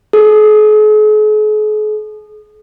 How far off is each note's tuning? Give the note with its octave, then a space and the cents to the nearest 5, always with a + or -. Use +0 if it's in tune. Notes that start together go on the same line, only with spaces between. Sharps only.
G#4 +45